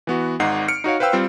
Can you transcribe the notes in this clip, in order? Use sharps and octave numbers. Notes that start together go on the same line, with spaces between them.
E3 B3 F#4
G#1 G#2 D#4 F#5 C7
F6 C#7 D7
D#4 F#4 C#5 F5
B4 C5 F5 G5 E6
G3 C4 F4